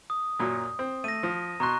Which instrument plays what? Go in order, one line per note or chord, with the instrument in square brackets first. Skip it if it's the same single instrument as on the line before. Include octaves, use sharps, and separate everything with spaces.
[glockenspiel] D#6
[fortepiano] F#2 A#2 F#3
C4
[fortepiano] A3 [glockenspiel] A#6 D#7
[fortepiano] F3
[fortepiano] B2 C6 [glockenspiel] A#5 C#6 F#6